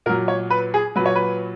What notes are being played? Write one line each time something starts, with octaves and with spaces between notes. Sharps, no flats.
A#2 F#3 A#4
C#5
B4
G#4
A#2 F#3 B4
C#5
B4